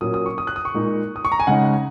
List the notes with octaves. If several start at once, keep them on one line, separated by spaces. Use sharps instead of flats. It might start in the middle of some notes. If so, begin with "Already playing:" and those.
A#2 F#3 C#4 D#6
D#6
C#6
D#6
F#6
D#6
C#6
A#2 G#3 D#4
D#6
C#6
A#5
G#5
C#3 G#3 D#4 F#5
F#5